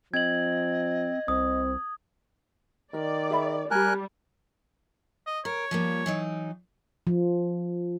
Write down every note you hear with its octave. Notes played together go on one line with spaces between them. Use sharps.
F3 C4 D#5 G#6 F#7
C2 C4 D#6
D#3 A#4 D5
G#4 E5 B5
G3 G4 A#4 G#5 A5 F#6
D#5
A#4 C#5
F3 G3 A#3
E3 F#3 D#4
F3